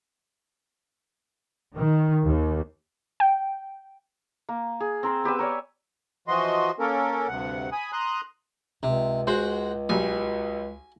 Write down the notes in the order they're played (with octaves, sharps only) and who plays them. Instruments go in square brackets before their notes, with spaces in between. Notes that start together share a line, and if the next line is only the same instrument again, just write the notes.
[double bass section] D#3
D#2
[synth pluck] G5
[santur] A#3
G#4
C4 A#4 C5
B3 G4 B4 E6
A#4 C#5 D5 G#5
[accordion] E3 F3 F#4 D#5 C6
A#3 C#4 A4 A#4
D2 G2 C3 F#5
G#5 B5 D#6
A#5 C6 D#6 F#6
[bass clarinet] C#2 [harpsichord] C3
[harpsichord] G#3 F#4 [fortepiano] C5
[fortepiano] B1 F#3 G3 [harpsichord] G#5